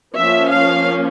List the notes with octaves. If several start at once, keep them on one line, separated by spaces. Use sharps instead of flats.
F3 A#3 C#4 E5
F5